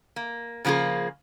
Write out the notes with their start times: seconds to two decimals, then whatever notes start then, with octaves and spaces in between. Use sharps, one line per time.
0.16 A#3
0.65 C#3 F3 A#3 F4 G#4